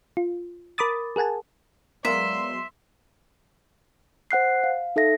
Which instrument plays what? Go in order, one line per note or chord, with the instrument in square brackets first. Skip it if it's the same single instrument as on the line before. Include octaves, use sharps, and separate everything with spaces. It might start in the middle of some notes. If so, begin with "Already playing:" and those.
[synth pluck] F4
A#4 B5 D6 D#6 A6
G#4 A#4 F#5 G#5 A5
[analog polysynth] F#3 G#3 B3 [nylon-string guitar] A#4 D5 F5 [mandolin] E5 [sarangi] C6
[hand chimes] C5 F#5 F#6 C7
F5
D#4 A4 E5 A#6